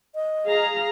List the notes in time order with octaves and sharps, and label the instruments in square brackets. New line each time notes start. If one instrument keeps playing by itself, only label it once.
[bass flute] D#5
[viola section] G#4 F5 A#5